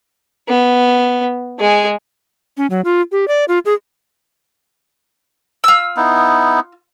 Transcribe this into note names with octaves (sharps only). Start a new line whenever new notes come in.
B3
G#3 G#4
C#4
F#3
F4
G4
D5
F4
G#4
F4 E6
B3 D#4 E4